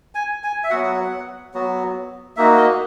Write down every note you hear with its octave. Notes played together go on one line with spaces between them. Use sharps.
G#5
G#5
E5
F#3 B3 F#4 F#5
F#3 B3 F#4
A#3 D#4 F#4 E5
D#5